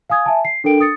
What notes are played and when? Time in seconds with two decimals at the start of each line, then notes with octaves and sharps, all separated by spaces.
0.10 F5 G#5 D#6 G#6
0.26 E5 G#5 A5
0.45 C7
0.64 D4 A4 A#4 G5 D7
0.80 D#6 A6 C#7